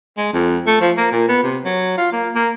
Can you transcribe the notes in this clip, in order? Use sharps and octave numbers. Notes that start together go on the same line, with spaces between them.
G#3
F2
A3
F3
A#3
A#2
B3
C3
F#3
F4
A#3
A#3